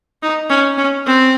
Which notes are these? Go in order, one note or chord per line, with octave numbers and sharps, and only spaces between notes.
D#4
C#4
C#4
C4